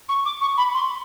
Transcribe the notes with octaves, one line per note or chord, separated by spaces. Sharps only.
C#6
D6
C#6
B5
C6